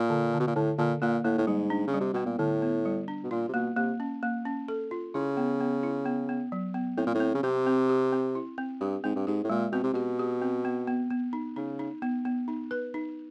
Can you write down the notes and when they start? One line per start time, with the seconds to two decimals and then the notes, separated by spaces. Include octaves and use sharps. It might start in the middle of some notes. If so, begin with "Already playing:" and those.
Already playing: A#2
0.10 D3
0.33 D3
0.40 B2
0.47 A#2
0.56 A2 D3
0.78 A#2 D3
1.02 A#2 A#3
1.24 A2 A#3
1.38 A2
1.47 G#2 G3
1.70 D4
1.87 C#3
1.94 G3
2.01 C3
2.14 B2 B3
2.26 A#2
2.39 A2 D3
2.62 B3
2.85 G3
3.08 D4
3.24 B2
3.31 A#2 F4
3.49 C3
3.54 B2 A#3
3.76 C3 A#3
4.00 C#4
4.23 A#3
4.45 C#4
4.68 A4
4.91 F4
5.14 C#3 E4
5.37 B3
5.60 B3
5.83 E4
6.06 B3
6.29 B3
6.52 F#3
6.74 B3
6.97 A2 C4
7.07 A#2
7.15 A2
7.20 C4
7.34 C#3
7.43 C3 C4
7.67 C4
7.89 G4
8.13 C4
8.35 E4
8.58 C4
8.81 G2 G4
9.04 G#2 C4
9.16 G2
9.27 G#2 G4
9.44 A2
9.50 A#2 G#3
9.72 B2 C4
9.83 C3
9.93 B2 G4
10.19 G4
10.42 C4
10.65 B3
10.87 B3
11.10 B3
11.33 D#4
11.56 C#3 D#4
11.79 D#4
12.02 B3
12.25 B3
12.48 D#4
12.71 B4
12.94 D#4